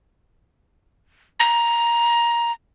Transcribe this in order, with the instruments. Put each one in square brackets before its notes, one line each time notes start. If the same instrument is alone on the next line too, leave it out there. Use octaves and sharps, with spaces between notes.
[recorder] A#5